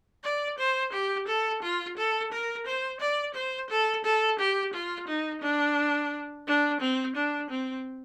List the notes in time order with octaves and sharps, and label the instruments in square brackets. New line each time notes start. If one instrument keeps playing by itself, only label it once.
[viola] D5
C5
G4
A4
F4
A4
A#4
C5
D5
C5
A4
A4
G4
F4
D#4
D4
D4
C4
D4
C4